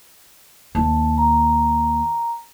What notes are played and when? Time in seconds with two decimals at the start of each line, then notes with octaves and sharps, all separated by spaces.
0.75 D#2 A5
1.18 A#5